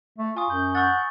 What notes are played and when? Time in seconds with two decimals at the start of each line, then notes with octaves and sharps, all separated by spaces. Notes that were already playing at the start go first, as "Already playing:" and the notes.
0.18 A3
0.37 F4 G#5 C#6 D#6
0.50 F#2 G6
0.75 F#5 C#6 E6 A6